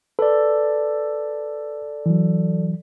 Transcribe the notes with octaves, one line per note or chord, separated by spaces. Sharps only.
A4 B4 D5
E3 F#3